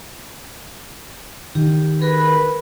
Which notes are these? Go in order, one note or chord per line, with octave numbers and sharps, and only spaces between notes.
D#3 G4
G#4 A#4 B4